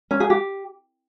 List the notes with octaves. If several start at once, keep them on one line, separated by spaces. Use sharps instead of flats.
C#4
G#4
G4